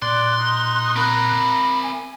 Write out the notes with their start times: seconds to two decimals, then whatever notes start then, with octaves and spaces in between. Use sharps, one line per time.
0.02 A#2 D5 C6 F#6
0.39 D#4
0.96 C4 A#4 A#5 B5
1.83 G#5